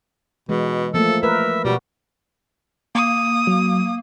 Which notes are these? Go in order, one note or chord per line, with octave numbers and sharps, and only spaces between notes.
B2 E3 G#3
F3 A3 A#3 A4
A#4 B4 E5
B2 G3 F#4
A#3 D#6
F#3